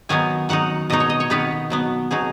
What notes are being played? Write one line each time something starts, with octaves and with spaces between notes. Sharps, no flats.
D#3 F#3 B3 D#4 G#5
D#3 F#3 D#4 F#5
B2 F#3 D#4 D#5
C#5
D#5
C#5
D#3 B3 D#4 B4
B2 F#3 B3
B2 F#3 D#4 G#4